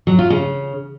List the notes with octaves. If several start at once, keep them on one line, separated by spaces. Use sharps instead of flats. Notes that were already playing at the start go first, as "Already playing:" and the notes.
F#3
F4
C#3